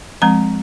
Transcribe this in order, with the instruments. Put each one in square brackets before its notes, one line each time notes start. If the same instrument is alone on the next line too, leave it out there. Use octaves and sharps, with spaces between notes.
[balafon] F3 G#3 C4 A#5